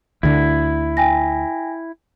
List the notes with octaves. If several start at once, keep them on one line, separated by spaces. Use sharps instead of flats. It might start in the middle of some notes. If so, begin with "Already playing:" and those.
D2 D3 E4
G5 G#5 A#6